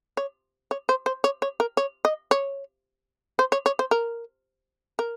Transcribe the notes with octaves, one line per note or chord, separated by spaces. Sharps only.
C#5
C#5
C5
C5
C#5
C#5
A#4
C#5
D#5
C#5
C5
C#5
C#5
C5
A#4
A#4